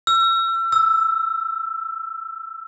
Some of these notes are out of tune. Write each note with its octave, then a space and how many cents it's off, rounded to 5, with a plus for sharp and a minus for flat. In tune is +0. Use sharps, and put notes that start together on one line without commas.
E6 +35
E6 +0